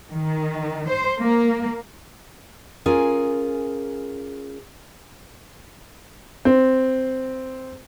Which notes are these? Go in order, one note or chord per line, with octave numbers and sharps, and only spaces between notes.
D#3
C5
A#3
C#4 F4 G#4 A#4 G#5
C4